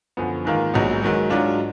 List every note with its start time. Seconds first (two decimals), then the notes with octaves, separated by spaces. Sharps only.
0.17 F#2 D3 F3 B3
0.45 G#2 D#3 A#3 F4
0.74 A#1 G#2 F#3 B3 D#4
1.01 G#2 D#3 F#3
1.30 G#2 F#3 D4 F4